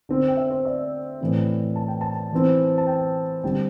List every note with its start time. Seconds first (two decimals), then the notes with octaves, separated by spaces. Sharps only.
0.09 D3 C4
0.28 G5
0.37 E5
0.50 C5
0.65 D5
1.21 A2 E3 C4
1.76 A5
1.88 G5
2.01 A5
2.32 E3 C4
2.78 A5
2.87 G5
3.44 D3 G3 C4 G5